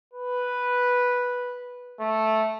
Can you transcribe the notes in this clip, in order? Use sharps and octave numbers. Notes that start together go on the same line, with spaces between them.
B4
A3